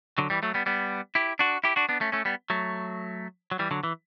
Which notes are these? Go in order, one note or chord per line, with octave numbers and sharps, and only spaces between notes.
D3 F#3
E3 G3
F#3 A3
G3 B3
G3 B3
E4 G4
D4 F#4
E4 G4
D4 F#4
B3 D4
A3 C#4
A3 C#4
G3 B3
F#3 A3
F#3
E3 G3
D3 F#3
E3